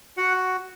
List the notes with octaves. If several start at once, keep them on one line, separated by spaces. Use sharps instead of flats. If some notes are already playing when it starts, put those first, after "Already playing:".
F#4 F#5